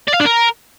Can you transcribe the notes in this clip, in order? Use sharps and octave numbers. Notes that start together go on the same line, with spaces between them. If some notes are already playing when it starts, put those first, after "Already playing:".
D5
F5
D4
A#4